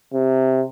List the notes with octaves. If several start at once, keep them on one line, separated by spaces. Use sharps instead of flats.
C3